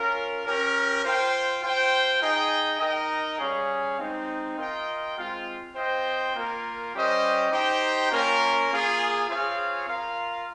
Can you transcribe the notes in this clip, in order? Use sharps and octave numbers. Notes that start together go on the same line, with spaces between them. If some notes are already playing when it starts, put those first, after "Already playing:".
Already playing: C#4 F4 A#4
C#4 G4 A#4
F4 C5 G5
F4 C5 G5
D#4 G#4 D#5 G5
D#4 A#4 D#5 G5
G3 C#4 G#4 C#5 F5
G#3 C4 D#4
F4 A#4 D#5 G5
G#3 C4 F4
C4 F4 C5 D#5 G5
A#3 F4 A#4
G3 C#4 G4 C5 D#5
D#4 G4 C5 G5
A#3 C#4 F4 A#4
A#3 F4 G#4
C4 F4 G#4 C#5 F5
F4 A#4 F5